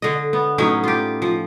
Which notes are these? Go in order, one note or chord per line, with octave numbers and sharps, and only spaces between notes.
D3 D#5
B3
A2 F#3 C#4 D#4
F4 G4
F3